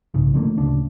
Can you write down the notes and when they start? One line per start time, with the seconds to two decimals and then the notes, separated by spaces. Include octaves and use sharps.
0.14 B1 G#2 C#3
0.34 D3 F3 A3 A#3
0.57 D1 D2 C#3 D4